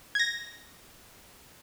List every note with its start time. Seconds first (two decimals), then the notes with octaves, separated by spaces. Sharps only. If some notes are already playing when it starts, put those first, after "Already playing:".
0.15 G#6 A#6